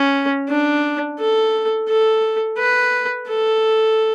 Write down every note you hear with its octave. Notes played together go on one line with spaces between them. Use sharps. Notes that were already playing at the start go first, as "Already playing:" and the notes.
Already playing: C#4
D4
A4
A4
B4
A4